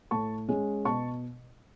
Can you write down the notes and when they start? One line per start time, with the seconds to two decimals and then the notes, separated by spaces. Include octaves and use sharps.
0.11 A2 A5 C#6
0.49 G#3 C#4
0.85 B2 A5 C#6